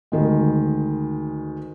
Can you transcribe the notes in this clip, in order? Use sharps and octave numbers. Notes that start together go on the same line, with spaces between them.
D2 D#3 G#3